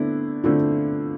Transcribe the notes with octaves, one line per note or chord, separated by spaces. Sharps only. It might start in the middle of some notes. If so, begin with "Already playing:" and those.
Already playing: D3 A3 B3 C4 D4 E4
D3 A3 C4 D4 E4 F4